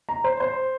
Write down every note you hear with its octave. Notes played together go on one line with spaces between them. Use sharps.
A#5
C5
C5